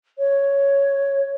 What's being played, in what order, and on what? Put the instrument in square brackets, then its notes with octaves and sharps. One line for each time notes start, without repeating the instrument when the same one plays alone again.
[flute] C#5